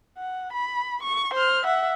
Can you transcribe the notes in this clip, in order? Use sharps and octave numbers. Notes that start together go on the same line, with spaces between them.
F#5
B5
C#6
C5 F6
E5 F#5